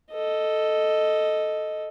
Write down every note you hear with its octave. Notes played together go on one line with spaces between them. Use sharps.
A4 D#5